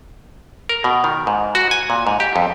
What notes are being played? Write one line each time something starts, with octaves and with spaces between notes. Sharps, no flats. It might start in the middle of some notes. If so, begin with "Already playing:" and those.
A#4
B2
D#3
G#2
F#4
G#5
A#2
G#2
G4
F2